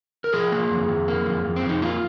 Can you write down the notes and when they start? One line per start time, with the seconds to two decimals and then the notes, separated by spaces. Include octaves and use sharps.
0.24 A#4
0.33 F3 G#4
0.52 A#3
0.70 F2
0.89 F2
1.08 A#3
1.26 F2
1.45 F2
1.56 C4
1.63 F2
1.69 D#4
1.82 A#3 F4